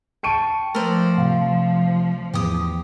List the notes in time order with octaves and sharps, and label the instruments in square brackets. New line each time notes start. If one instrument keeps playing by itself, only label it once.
[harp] G5 C#6 [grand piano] A5 C#7 D#7
[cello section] F3 [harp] A3 [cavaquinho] A#4 C5 D5
[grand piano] C3 F5
[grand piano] E2 [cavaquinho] G4 D#6